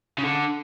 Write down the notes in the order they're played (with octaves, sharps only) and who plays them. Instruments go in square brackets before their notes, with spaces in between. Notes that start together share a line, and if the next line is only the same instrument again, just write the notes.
[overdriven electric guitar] C#3
D3